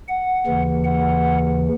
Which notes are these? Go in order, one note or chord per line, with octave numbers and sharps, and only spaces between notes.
F#5
D#2 C#3 E3
F#5